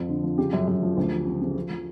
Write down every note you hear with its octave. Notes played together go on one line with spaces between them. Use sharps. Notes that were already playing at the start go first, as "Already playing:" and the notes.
Already playing: F2 F3
D3
F3
C#3 G4
F#2
F#2
F3
D2
F3
C#3
C#3
F3
F3